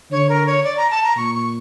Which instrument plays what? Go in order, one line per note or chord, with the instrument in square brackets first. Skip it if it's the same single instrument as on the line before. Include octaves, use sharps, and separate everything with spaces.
[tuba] D3 [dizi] C#5
[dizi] A#4
C#5
D5
A#5
A5
A#5
[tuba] A#2 [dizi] C#6
[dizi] C#6